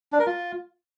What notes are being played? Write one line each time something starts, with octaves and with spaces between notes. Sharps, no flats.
D4
A#4
F4